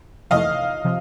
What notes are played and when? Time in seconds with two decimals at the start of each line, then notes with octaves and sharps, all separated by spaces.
0.30 F2 C3 E3 A3 D#5 F5
0.84 C3 F3